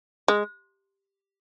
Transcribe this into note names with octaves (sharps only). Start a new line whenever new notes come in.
G#3